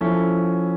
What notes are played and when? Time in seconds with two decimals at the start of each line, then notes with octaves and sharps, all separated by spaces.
0.01 F3 C#4 E4 A4